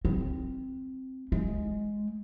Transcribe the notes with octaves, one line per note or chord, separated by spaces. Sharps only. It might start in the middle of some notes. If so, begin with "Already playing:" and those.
C4
G#3